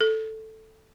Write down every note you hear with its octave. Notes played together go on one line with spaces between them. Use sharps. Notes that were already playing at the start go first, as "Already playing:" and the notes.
A4